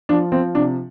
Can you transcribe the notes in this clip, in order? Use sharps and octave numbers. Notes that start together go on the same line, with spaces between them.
F3 D4
F3 C4
C3 D4